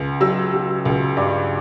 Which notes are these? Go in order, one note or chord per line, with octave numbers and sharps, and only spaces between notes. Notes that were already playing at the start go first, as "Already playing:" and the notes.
Already playing: C#2
F#3 E6
F#3
C#2
G2 D6